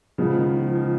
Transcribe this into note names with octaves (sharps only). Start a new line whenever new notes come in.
C#3 F3 G#3 B3
D#3
F3
F3